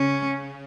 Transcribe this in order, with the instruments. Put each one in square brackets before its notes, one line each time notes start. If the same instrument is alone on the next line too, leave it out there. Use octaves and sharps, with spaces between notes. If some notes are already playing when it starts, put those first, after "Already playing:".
Already playing: [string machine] C#3 [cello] C#4